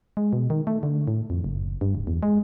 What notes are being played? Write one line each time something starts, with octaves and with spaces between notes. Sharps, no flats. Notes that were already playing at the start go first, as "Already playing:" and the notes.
G#3
B2
D#3
A3
D3
A2
F2
F#1
G2
D1
E2
G#3